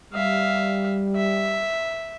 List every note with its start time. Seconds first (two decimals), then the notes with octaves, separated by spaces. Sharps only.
0.14 G3 E5 F5
1.16 E5